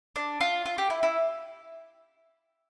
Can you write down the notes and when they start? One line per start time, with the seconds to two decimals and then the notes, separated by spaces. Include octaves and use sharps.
0.16 D4
0.41 F4
0.66 F4
0.78 G4
0.90 E4
1.03 E4